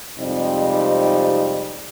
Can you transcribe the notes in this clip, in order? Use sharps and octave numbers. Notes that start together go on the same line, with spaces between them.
F2 G#2 C3 G3 D#4